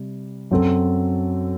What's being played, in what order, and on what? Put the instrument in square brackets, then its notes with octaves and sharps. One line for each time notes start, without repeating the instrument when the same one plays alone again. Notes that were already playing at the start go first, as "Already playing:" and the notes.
Already playing: [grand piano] C3 G3
F#2 F#3 C4 F#4 A4